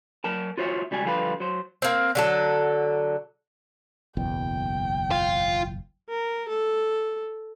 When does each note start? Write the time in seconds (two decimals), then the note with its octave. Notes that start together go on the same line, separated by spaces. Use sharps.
0.24 F#3 A#4 A5
0.58 F4 F#4 C5 C#5 E5
0.91 C#2 G3 F#4 G#5
1.05 D3 F3 G3 F4 G#4 B4
1.40 F#3 C5
1.82 A#3 C4
2.15 D3 F#3 A4
4.17 F#1 B1 E2 G5
5.11 F4
6.09 A#4
6.49 A4